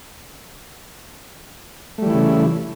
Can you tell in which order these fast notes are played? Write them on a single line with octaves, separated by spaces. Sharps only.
A3 G3 E3 E4 C#3